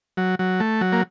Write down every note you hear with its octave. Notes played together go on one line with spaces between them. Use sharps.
F#3
F#3
A3
F#3
A#3